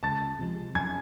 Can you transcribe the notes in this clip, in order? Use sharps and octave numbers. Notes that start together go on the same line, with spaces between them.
C#2 A5 A6
C3 F3 G#3
F#2 G#5 G#6